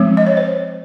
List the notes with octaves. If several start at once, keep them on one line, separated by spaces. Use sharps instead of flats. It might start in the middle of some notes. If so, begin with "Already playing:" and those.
Already playing: F3 G#3 C4
D#5
C#5
C5